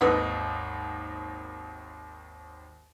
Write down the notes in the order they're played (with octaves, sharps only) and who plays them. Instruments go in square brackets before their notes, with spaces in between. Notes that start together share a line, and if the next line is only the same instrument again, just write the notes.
[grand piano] G#1 D#2 D#4 [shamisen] A4 B4 F#5